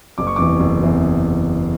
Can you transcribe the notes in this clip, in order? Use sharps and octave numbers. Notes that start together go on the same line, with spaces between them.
F#1 D6
C#6
E2 C3 E3 D6
F#1
E2 C3 E3